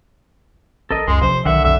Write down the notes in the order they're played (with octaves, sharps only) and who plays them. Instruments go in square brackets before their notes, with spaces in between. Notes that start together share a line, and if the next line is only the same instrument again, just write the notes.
[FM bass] A1 [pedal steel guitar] A4 A#4 D#5
[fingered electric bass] C#2 [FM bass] F#2 [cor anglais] G#3 [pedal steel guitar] C6
[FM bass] A1 [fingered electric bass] C3 E3 F3 [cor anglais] C5
[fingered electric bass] B1 [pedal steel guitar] D3 F#5 [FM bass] D#3 [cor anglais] E5
[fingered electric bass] B1 [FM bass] F2 [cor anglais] E5